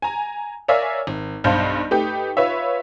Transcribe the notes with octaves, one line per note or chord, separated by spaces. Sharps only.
G#5 A#5
A#4 C#5 D5 E5 F5 G#5
G#1
B1 G2 C5 F5 A5 G6
A3 D#4 G4 B4 G5
F4 B4 C#5 E5